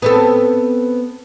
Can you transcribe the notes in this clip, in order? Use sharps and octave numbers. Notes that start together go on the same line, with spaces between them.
B3 C4 A4